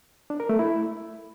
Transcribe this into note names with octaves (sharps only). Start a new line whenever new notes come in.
D4
A#4
A3
E4